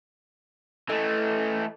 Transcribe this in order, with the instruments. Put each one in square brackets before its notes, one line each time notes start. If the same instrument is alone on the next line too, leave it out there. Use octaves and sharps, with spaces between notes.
[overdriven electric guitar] E3 A3 [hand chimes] A4 D#5